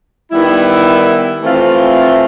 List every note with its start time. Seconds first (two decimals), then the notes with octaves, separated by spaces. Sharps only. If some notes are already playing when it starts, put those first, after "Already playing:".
0.31 D#3 G3 B3 E4
1.43 E3 A3 C4 F4